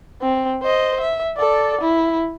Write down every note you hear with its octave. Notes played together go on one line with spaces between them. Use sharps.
C4
C5 D#5
E5
A4 D5
E4